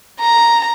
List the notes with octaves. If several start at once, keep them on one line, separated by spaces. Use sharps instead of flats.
A#5